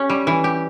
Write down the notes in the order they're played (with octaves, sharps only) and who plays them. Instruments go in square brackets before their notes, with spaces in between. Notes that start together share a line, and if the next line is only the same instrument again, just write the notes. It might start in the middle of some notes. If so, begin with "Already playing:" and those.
Already playing: [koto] C#4 G4
G3
E3
G4